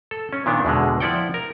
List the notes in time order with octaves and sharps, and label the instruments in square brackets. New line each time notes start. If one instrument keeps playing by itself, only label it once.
[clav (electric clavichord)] A4
C#4
A#2 D#3 B3 D4
E2 B2 D3 G#3
F3 E4 D5 F#5 G5
A#4